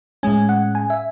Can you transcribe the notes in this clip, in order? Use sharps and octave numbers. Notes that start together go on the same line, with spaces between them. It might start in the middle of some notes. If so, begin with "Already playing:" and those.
A2 G#3 C#4 G#5
F#5
G#5
E5